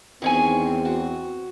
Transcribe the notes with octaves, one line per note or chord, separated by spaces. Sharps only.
E2 D#3 C4 C#5 G#5
F#4